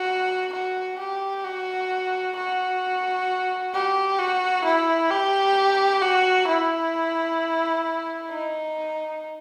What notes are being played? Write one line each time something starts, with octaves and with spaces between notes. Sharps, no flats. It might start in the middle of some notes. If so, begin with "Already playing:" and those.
Already playing: F#4
F#4
G4
F#4
F#4
G4
F#4
E4
G4
F#4
E4
D#4